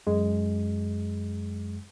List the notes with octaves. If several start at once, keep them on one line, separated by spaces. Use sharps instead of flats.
F#2 G#3